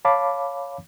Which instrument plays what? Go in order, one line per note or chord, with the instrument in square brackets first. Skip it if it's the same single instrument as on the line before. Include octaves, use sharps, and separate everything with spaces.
[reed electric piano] C#5 F5 A5 B5 D6